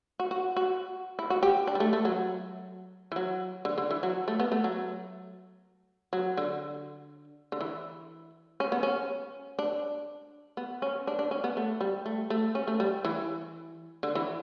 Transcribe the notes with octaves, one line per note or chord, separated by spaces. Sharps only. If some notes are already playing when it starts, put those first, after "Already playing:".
F#4
F#4
F#4
E4
F#4
G4
D4
G3
A3
A3
F#3
E3
F#3
D3
D3
E3
F#3
A3
B3
A3
F#3
F#3
D3
D3
E3
C#4
B3
C#4
D4
B3
C#4
D4
D4
C#4
B3
A3
G3
A3
A3
C#4
A3
G3
E3
D3
E3